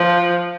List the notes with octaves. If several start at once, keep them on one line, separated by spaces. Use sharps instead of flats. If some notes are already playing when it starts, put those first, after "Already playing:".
Already playing: F3